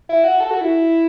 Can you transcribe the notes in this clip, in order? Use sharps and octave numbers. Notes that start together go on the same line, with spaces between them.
E4
F#4
A4
F#4
E4